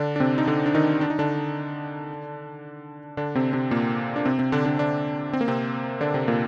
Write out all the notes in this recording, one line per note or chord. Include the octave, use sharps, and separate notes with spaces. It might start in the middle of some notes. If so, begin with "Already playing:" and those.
Already playing: D3 D4
D4
C3 C4
D#4
D3 D4
D4
D#3 D#4
D4
D#4
D3 D4
D3 D4
C3 C4
C3 C4
A#2 A#3
D4
C3 C4
C3 C4
D3 D4
D3 D4
D3 D4
C4
A#3
C3 C4
D3 D4
C3 C4
A#2 A#3